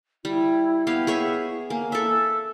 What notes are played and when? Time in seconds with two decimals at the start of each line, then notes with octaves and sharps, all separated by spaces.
0.25 G3 E4
0.87 B3 G4 F5
1.07 G#4 C#5 E5
1.70 A#3 G#5
1.92 A4 E5 E6